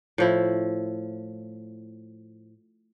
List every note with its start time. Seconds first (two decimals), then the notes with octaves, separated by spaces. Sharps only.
0.18 A2 F3 E4